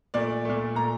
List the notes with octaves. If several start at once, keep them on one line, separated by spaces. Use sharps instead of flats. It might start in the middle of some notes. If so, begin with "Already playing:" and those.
A#2 A3 D5
A#2 A3
A#2 A3 A#5